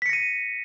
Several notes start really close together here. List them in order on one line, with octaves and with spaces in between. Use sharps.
B6 C#7 A#6 D#7